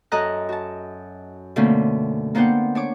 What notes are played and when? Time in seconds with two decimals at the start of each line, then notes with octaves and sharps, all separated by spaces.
0.12 F#2 A4 D#5 A#5 F#6
0.49 F#4 A5
1.56 B2 D3 A3 A#3 C4 C#4
2.35 A#3 B3 D4 C5 F#5 G5
2.75 D4 C#5 D6